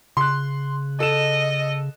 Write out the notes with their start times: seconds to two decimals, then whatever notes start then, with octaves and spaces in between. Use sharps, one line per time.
0.17 C#3 C6 F#6
1.00 A4 D#5 E7